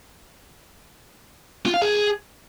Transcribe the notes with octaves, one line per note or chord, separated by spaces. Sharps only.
F4
F5
G#4